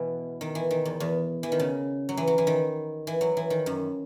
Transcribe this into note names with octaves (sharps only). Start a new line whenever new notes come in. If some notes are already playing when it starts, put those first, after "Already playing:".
Already playing: B2 E3
D#3
E3
D#3
E2
E2
E3
D#3
C#3
F#3
E3
F#3
E3
D#3
E3
F#3
E3
D#3
F#2